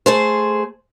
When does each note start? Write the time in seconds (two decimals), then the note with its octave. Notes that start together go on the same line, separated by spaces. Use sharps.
0.06 A3 G#4 C5